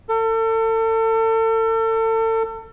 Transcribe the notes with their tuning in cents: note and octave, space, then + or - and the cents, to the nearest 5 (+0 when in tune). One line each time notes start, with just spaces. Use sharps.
A4 +35